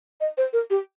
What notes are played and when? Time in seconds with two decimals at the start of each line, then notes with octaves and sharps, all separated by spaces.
0.21 D#5
0.38 C5
0.53 A#4
0.70 G4